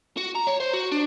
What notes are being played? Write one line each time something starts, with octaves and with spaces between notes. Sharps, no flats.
F#4
A#5
C#5
C5
F#4
D4